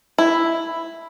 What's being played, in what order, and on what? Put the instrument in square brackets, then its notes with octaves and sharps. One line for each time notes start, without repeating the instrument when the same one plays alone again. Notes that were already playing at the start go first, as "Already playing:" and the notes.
[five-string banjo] E4